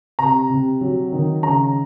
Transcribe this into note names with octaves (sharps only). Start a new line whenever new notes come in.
C3 A#5
C3
F#3
D#3
C#3 A#5